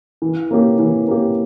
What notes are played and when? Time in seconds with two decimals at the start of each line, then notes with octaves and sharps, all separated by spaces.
0.22 E3
0.51 A#3 C#4 G4
0.79 E3
1.08 A#3 C#4 G4